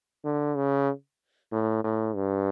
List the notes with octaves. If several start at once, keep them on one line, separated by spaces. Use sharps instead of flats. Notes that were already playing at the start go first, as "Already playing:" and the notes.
D3
C#3
A2
A2
G2